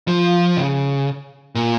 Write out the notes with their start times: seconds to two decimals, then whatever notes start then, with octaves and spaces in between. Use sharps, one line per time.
0.08 F3
0.57 C#3
1.55 A#2